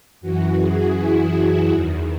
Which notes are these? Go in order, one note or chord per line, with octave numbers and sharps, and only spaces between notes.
F#2 E3 F#4
G#4
E4
G#4
E2 D#3